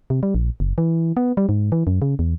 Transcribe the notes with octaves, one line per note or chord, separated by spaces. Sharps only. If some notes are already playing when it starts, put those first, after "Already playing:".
C3
G3
A#1
F#1
E3
B3
G3
G#2
E3
F#2
C#3
E2